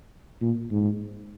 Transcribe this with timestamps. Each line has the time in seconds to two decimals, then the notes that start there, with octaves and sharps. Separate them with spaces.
0.42 A#2
0.71 G#2